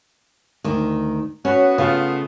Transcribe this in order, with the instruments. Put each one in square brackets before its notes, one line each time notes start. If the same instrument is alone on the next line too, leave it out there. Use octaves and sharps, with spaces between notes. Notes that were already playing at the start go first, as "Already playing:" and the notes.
[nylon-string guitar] D2 D#3
[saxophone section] B3 F#4 [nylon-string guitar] C#4
[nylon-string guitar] C#3 [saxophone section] A3 B3 F4